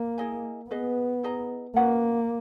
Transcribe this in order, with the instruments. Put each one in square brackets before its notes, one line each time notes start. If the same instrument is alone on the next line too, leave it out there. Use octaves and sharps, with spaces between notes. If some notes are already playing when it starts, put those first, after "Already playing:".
Already playing: [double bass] A#3
[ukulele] E4 G#4 D#5 G#5
[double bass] B3 [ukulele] G#4 B4 D#5
[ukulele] E4 G#4 D#5 A#5
[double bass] A#3 [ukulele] C#4 F#4 B4 F#5